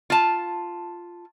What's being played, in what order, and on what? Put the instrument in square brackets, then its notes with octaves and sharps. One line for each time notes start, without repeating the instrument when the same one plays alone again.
[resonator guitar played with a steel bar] F4 A5